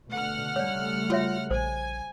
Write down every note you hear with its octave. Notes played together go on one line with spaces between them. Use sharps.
B2 D3 A3 F#5 F6
C#3 G3 A3 C#5 D5
F4 F#4 C#5 E5
A#1 C5 G#5